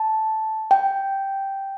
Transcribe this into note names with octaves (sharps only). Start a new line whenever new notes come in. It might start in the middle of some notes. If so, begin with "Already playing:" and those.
Already playing: A5
G5